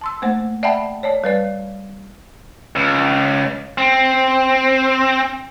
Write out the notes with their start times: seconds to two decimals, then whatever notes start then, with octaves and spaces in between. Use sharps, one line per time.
0.01 A5 C6 E6
0.22 A3 A#3 C5 F#5
0.63 D5 E5 F#5 G5 A5 B5
1.03 C#5 D5 A5
1.24 G3 B4 D5
2.76 C#2
3.78 C4